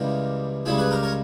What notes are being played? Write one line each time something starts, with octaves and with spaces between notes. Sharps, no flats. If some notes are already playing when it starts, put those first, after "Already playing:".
Already playing: C#2 C#3 E3 G3 G4 A#4
C#2 C#3 G3 E4 G#4
G#4 B4
G4 A#4
A#4 C#5